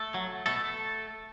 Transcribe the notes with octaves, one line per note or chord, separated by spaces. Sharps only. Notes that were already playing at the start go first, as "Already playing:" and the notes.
Already playing: A3 A4
F#3
B2 A3 A4